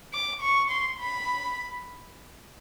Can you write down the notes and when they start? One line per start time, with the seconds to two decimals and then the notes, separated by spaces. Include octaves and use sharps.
0.13 D6
0.42 C#6
0.70 C6
0.99 B5